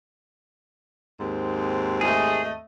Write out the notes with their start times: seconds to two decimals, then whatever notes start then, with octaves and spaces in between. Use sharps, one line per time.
1.18 D#2 G#2 C4
2.01 A3 G#4 D#5